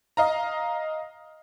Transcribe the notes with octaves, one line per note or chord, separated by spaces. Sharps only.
D#5 F5 A#5